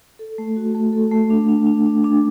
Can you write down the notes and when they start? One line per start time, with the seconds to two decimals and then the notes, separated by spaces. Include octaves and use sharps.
0.19 A4
0.38 A3
0.56 F#4
0.75 A3
0.93 A4
1.11 A3
1.30 D4
1.48 D4
1.66 D4
1.86 D4
2.04 D4